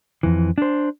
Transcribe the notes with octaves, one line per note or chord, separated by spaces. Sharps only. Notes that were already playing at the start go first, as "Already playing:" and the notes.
F2 E3
D4 C5